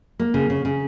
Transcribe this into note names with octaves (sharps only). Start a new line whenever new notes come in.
A#3
C#3
C#3
C#3